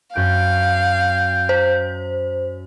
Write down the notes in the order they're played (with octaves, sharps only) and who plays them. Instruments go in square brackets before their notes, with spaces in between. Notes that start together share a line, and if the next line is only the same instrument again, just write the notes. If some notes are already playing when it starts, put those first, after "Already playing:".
[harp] F#2 F#6 D7 [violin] F5 [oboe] G5
[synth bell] C5